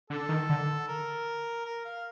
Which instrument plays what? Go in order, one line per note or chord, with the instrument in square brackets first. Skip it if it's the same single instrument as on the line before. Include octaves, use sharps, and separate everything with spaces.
[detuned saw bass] D3 [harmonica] A4
[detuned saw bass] D#3
D3
[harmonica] A#4
A#4
F5